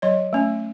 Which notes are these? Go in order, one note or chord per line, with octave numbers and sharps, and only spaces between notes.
F#3 C#5 D#5
A3 C#4